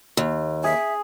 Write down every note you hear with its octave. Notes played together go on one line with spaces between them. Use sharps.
D#2
G#4 E5